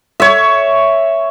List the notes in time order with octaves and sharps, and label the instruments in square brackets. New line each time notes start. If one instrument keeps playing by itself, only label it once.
[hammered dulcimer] C#5 E5